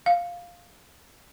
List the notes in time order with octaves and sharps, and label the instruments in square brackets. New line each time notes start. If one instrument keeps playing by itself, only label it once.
[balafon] F5